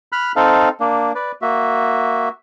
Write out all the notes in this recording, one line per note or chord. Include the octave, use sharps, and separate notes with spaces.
B5 F6 F#6
C4 D#4 A4 F5
A#3 D4
B4 D5
A#3 F#4 E5